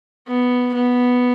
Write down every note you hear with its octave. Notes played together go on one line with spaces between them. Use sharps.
B3
B3